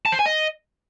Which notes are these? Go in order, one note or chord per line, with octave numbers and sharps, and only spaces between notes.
A5
C5
G#5
D#5